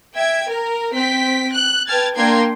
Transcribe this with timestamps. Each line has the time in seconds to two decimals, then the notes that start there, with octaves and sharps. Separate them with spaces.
0.16 E5 G5 G#6
0.49 A#4
0.93 C4 G5 B6
1.51 F#6
1.87 B4 G5 A5 F6 G#6 A6
2.16 A#3 D4 G5 A#5 C6 G#6